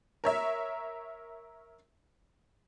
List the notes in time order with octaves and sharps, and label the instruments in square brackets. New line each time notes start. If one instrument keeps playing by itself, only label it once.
[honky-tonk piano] A#4 C#5 E5